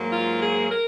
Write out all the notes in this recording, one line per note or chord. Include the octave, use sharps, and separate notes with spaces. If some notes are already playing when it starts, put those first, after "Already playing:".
Already playing: G#2 F#3 A#3
F4
G#4
A#4